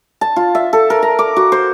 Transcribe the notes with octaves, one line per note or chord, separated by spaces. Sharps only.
A5
F4
E5
A4
A#4
A#5
D6
F#4
C5